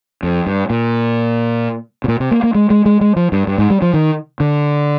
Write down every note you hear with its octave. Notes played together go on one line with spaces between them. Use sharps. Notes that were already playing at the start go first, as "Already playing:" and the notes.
F2
G2
A#2
C3
A#2
C3
A#3
A#3
G#3
G#3
G#3
G#3
F3
G2
G2
G#2
G3
F3
D#3
D3